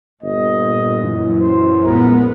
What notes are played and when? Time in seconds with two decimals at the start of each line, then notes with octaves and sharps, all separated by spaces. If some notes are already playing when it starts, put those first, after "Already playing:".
0.23 G1 A#2 D#5
1.03 F#2 E3
1.41 C5
1.83 A#1 G#3 B3 A#4